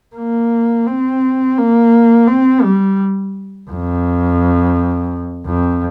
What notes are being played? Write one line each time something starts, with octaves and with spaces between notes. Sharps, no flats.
A#3
C4
A#3
C4
G3
F2
F2